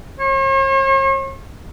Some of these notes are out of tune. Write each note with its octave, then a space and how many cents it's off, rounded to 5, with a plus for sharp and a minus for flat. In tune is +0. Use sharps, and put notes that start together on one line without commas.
C#5 -45